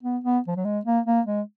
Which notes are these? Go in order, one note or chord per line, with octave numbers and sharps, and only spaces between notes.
B3
B3
F3
F#3
G#3
A#3
A#3
G#3